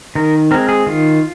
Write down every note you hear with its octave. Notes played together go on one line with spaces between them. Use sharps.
D#3 A#4
G#3 C4 A#4
G#4
D#3 F4